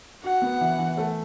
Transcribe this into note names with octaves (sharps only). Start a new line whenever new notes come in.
F#4 F#5
B3
E3
E3
A3